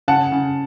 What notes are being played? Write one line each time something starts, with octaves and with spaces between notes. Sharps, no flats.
C#3 F#5 A5
C#3